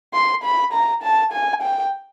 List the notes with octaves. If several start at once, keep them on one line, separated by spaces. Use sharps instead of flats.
C6
B5
A#5
A5
G#5
G5